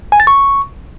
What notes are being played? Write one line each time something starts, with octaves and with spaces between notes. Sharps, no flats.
G#5
A6
C#6